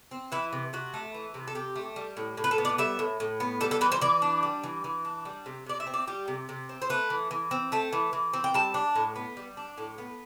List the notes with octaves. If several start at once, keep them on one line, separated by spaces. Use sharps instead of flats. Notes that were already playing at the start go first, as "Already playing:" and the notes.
C4
E3 E4
C3
C3 F#4
A3
E3
C3
A4
C3 G4
A3
G3
A2
A2
B4
A4
B3
D5
G3 E5
A2
A2
B3
G3 A4
A4
E3 B4
C5
E3 D5
D4
G3
E3
E3
D4
G3
C3
C3 D5
E5
C4
D5
G3 G4
C3
C3
C4
C5
A3 B4
E3
E3
C4
A3 A5
E3
E3
C4
G5
G3 A5
D4
A2
B3
G3
D4
A2
B3